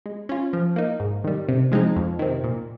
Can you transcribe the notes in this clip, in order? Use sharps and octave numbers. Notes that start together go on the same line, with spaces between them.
G#3
C#4 F4
F3
A#3 D#4
G#2
D#3 G3
C3
F3 G#3 C4 D#4
F2
C3 D#3
A#2